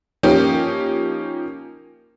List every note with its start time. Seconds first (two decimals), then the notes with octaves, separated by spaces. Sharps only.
0.23 F3 A#3 C#4 D#4 G4